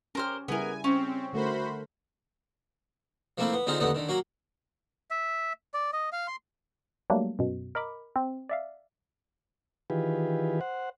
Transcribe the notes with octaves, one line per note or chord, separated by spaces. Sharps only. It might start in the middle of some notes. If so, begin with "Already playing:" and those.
C#4 G4 A#4 C5 F6
C#3 G3 B3 E4 A#4 G#5
C4 C#4
D3 A3 F#4 A#4 C5 B5
F3 A3 A#3 C4 E4
B3
D3 B3 C4 D#4 F4 G#4
A1 D#2 D3 B3 D#4 D#6
D3 D#3
F#3 A#3 F#4
E5
D5
D#5
F5
C6
F#3 G3 A3 A#3 D4
F#2 B2
A#4 D#5 B5 D6
C4
D5 E5 F5
D#3 E3 F4 G4 G#4 B4
C5 F#5